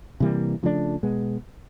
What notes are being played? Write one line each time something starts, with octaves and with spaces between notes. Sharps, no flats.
C3 E3 G3 A#3
C#3 F3 A3 D4
B2 G#3 B3